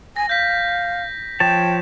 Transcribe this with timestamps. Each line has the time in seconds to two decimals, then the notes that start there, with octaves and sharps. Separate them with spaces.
0.16 G#5 A#6
0.29 F5 G6 B6
1.40 F3 C#5 G5 A5 E7